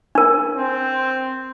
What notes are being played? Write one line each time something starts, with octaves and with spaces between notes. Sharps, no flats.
D4 A#4
C4